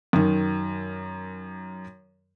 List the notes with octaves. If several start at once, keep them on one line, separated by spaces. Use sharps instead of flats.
F#2 D#3